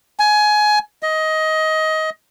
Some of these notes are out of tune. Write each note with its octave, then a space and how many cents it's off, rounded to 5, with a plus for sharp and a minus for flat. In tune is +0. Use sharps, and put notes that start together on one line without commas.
G#5 +20
D#5 +20